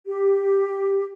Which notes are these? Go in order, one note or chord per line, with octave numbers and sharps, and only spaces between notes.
G4